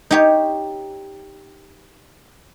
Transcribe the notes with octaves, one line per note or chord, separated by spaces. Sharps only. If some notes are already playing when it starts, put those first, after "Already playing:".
D#4 G4 C#5